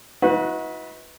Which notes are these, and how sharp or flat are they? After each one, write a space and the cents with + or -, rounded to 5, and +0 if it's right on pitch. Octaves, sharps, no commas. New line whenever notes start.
D#4 +45 F#4 -25 B4 +0